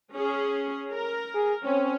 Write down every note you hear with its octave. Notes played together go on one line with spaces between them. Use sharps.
C#4 G#4
A#4
G#4
C4 C#4